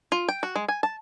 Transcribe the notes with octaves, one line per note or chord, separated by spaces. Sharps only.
F4
G5
F#4
G#3
G#5
A5